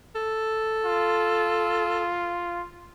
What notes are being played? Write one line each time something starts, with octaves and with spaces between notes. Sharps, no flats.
A4
F4